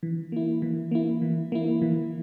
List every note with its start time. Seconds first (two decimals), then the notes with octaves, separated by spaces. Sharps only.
0.03 E3
0.32 A#3 E4
0.62 E3
0.91 A#3 E4
1.22 E3
1.52 A#3 E4
1.82 E3